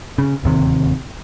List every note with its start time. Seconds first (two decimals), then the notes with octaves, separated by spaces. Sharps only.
0.18 C#3
0.43 D1 D#2 C3